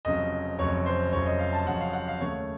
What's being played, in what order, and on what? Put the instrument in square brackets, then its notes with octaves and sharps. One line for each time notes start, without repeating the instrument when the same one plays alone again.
[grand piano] F1 F2 C#3 F#3 D#5
F1 F2 C#3 F#3 C#5
C5
F1 F2 C#3 F#3 C#5
D#5
F5
A5
F1 F2 C#3 F#3 F#5
F5
F#5
F5
D#2 C#3 A3 C#5